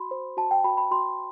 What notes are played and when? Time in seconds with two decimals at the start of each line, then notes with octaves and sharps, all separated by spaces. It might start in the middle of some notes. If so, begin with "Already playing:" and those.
Already playing: F#4 B5 C6
0.11 C5
0.37 F#4 A5
0.51 G5
0.64 F#4 B5
0.77 B5
0.91 F#4 C6